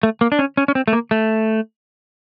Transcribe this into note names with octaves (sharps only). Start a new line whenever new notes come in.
A3
A#3
D4
C#4
C#4
C#4
C4
A3
A#3
A3